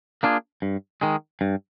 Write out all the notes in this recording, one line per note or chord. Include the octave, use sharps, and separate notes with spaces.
A#3 D4 F4 G#4
G2
D#3 G#3
G2